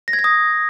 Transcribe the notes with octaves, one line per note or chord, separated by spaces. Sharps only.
A#6
G#6
A#6
D#6